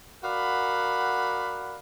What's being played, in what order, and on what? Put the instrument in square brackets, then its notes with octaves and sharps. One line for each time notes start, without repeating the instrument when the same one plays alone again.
[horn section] F#4 A#4 D5 F5 F#5 B5